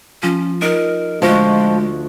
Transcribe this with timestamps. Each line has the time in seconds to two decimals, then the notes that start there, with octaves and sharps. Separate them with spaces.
0.23 F3 C#4
0.62 D#4 A#4
1.22 D2 F3 G#3 F4 C#6